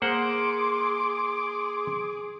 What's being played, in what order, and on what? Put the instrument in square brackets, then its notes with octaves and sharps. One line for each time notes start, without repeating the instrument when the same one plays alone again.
[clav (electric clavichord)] A#3 C5 F#5 [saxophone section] G#4 [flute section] C6 [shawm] D6